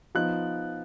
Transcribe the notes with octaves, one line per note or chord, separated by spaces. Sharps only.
F3 B3 D#4 F#6